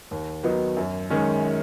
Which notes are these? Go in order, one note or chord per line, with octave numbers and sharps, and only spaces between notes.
D#2
D#3 F#3 B3 D#4
F#2
D#3 G#3 C#4